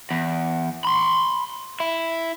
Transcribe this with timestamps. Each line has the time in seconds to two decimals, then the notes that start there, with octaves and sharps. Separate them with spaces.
0.11 E2
0.85 B5 C6
1.80 E4